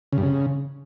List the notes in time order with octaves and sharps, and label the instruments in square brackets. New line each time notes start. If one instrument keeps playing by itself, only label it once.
[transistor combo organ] C#3
G2
C#3